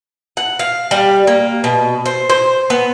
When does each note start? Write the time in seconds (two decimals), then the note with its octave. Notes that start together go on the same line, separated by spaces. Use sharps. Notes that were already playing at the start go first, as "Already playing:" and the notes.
0.37 F#5
0.59 F5
0.91 G3
1.27 A#3
1.64 B2
2.06 C5
2.30 C5
2.70 B3